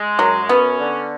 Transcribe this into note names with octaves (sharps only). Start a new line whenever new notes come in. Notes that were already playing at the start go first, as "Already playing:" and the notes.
Already playing: G#3
F#2 F#3
B3 C#4
D3